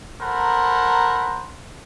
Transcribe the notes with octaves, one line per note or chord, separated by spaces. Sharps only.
A4 A#4 C5 F#5 A#5 B5